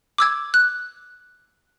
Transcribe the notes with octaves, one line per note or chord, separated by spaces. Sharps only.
D6 E6 G#6
F#6